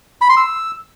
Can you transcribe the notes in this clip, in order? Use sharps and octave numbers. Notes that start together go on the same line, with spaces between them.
B5
C6
E6